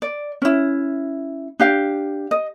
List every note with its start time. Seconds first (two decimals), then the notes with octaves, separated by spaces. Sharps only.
0.02 D5
0.42 C#4 E4
1.60 D4 G4 F5
2.31 D#5